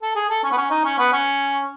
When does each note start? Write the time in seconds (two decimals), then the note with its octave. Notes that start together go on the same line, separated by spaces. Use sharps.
0.03 A4
0.16 G#4
0.30 A4
0.44 C#4
0.52 B3
0.58 C#4
0.71 D#4
0.85 C#4
0.99 B3
1.13 C#4